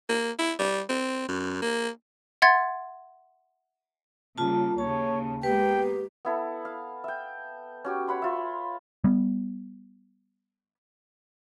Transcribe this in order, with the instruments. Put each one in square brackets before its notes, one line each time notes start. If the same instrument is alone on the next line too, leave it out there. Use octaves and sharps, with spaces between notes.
[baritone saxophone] A#3
E4
G3
C4
F#2
A#3
[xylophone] E5 F#5 C6 G#6 A6
[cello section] C#3 G3 A#3 [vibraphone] F4 A5
[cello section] D#2 C#3 [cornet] C#5 [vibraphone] A5
[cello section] G#3 A#3 B3 [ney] G4 [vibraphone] B4 [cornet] G5
[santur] B3 E4 A4
F5
E5 G5
C#4 F#4 G4
C#5 F#5 B5 C6
F4 E5
[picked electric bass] G3 B3